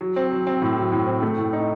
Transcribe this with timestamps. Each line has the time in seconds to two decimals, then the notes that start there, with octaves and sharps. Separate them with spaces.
0.01 F#3
0.16 C4
0.31 F#3
0.47 C4
0.62 A2
0.77 F#3
0.92 A2
1.07 C4
1.22 A3
1.38 A2
1.53 D#4